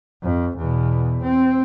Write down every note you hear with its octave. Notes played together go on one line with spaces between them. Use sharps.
F2
E2 B2
C4